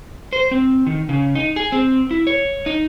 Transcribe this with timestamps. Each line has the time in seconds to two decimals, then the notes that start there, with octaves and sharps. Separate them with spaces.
0.33 C5
0.51 C4
0.87 D#3
1.09 C#3
1.35 D#4
1.56 G#4
1.72 C4
2.11 E4
2.27 C#5
2.66 D#4